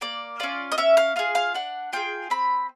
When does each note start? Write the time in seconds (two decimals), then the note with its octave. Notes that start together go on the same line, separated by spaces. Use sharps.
0.01 A#3 D5
0.40 C#4 F4 D5
0.72 D#5
0.78 C#4 E5
0.97 F5
1.16 F4 G#4 F5
1.35 F5
1.54 D4 F#5
1.93 F4 G#4 G5
2.30 C4 B5